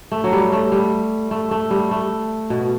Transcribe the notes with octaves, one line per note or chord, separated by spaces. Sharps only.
A3
F#3
G3
A3
G3
A3
A3
G3
A3
B2